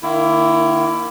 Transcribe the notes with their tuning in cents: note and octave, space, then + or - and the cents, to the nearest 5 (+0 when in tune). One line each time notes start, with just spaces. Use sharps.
D#3 -20 A#3 +0 E4 +20